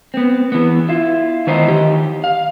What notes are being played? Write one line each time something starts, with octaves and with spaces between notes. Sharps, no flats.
B3 C4
E3 B3
E4 F4
D#3 E3 B3 D#4 C5
D#3 G4
F5